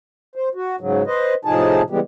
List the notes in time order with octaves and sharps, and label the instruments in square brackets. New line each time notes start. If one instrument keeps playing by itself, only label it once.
[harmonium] C5
F#4
G#2 C#3 F#3
B4 C5 D#5
A2 C3 F3 D#4 G#4 A5
C#3 E3 G3 G#3 B3 G4